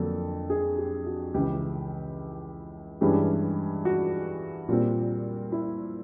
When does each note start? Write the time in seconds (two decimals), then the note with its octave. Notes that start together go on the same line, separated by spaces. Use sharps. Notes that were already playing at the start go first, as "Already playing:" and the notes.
Already playing: F2 D3 F#3 A#3 A4
0.50 G#4
0.78 G4
1.06 F#4
1.34 C#2 C#3 E3 G4
3.01 G2 E3 G#3 C#4 G4
3.85 F#4
4.69 A#2 G3 C4 F4
5.52 E4